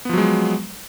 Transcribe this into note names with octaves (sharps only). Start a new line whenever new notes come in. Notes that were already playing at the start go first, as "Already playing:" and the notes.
F3 F#3 G#3 B3